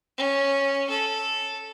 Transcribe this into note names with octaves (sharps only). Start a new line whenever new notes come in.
C#4
A4